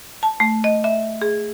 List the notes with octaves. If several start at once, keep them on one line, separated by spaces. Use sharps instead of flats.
A5
A3
D#5
E5
G#4